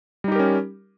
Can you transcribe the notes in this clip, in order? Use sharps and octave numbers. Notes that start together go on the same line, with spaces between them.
G3 C#4 D#4 G4 A#4